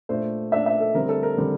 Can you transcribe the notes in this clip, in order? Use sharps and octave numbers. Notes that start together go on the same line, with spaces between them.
A#2 A3 D4 C5
A#2 A3 D4 E5
E5
A4
D3 G3 C4 A#4
A4
A#4
D3 G3 C4